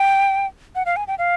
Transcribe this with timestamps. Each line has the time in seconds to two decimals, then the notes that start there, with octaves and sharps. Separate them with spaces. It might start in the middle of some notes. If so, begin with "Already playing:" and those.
Already playing: G5
0.75 F#5
0.86 F5
0.96 G#5
1.08 G5
1.19 F5